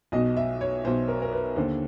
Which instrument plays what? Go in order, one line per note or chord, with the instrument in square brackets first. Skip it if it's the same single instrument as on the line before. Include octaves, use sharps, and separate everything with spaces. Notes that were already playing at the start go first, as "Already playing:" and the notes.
[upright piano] B1 B2 D#5
E5
C#5
B1 B2 C5
A#4
A#4
B4
D#2 D3 C5